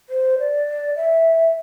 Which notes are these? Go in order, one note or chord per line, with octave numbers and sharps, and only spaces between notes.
C5
D5
E5